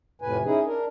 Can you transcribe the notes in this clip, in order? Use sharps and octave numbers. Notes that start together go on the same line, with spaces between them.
F2 A2 C3 B4 G#5
C#4 D#4 E4 G#4
D4 A#4